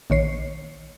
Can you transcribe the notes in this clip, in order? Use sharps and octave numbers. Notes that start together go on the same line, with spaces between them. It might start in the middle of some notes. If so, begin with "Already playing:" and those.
A#1 D#3 C#5 C7